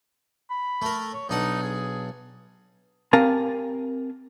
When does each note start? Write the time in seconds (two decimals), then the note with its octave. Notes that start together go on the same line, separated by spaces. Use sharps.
0.50 B5
0.82 A3 A#4
1.13 C#5
1.29 B1 D4 D#4 F#5
1.62 G#4
3.13 C4 G4 A#4 F5 G#5 A5